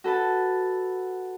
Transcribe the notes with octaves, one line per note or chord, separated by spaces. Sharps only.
F#4 A4 B4 A5